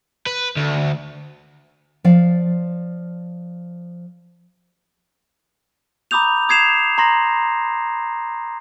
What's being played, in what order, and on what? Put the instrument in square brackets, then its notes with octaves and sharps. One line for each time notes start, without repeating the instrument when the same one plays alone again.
[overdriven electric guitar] B4
D2
[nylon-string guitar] F3 D5 F5
[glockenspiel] A#5 B5 D6 D#6 G6 F7
D#6 G#6 C7 E7 F7
A#5 C6 A#6